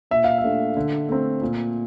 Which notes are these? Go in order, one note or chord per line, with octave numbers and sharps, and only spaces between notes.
A#2 E5
F5
E5
A3 D4
D3
A3 C4
A#2